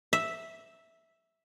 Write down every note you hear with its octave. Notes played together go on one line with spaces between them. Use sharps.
E5